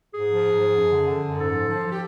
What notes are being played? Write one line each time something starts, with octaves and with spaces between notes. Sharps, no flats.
G#2 G#4
F3
G#2
F3
F#2
D3
D3
F#2
G#2 A4
F3
F3
F3
G4